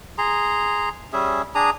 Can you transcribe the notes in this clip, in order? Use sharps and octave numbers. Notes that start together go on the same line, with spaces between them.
G#4 A#5 C6
G3 C#4 G#4 E5
D4 G#4 A#5 D#6